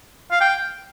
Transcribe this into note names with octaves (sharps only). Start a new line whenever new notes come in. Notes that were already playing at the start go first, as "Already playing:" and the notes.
F5
G5